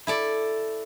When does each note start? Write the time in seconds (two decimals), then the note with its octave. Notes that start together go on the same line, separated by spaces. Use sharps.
0.07 E4 A4 D5